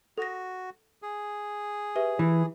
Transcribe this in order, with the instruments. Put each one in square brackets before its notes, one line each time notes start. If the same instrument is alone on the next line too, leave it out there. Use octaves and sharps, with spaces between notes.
[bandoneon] F#4 [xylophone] A4 A#6
[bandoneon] G#4
[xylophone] G4 B4 E5
[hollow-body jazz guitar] E3